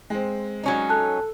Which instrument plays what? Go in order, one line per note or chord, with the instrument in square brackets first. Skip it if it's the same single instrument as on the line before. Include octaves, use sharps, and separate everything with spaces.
[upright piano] G#3 C4
[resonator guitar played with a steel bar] F#3 C#4 D#4
[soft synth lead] A4 [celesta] A5 F#6